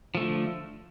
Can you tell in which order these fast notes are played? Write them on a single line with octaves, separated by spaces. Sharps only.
F3 A3 D3